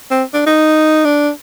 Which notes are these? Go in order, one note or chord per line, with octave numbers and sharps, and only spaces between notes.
C4
D4
D#4
D4